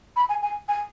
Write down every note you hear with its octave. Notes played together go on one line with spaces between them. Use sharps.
B5
G#5
G#5
G#5